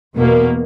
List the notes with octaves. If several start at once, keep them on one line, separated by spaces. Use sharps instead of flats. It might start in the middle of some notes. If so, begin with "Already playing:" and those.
E2 B2 A#3